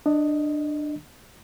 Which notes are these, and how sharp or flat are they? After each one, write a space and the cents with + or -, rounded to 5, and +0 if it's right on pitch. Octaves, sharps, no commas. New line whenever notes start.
D4 +20 D#5 +0